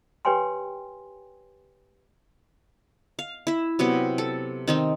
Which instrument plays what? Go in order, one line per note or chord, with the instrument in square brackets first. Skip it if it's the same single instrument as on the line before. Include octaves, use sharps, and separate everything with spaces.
[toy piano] G4 B4 C#5 G5 G#5 C6
[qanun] F5
E4 E5
C3 F#3 B3 G4
A4
D#3 C4 D#4